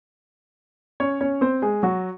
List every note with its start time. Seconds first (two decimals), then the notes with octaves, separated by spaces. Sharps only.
1.00 C#4 C#5
1.21 C#4 C#5
1.41 C4 C5
1.62 G#3 G#4
1.83 F#3 F#4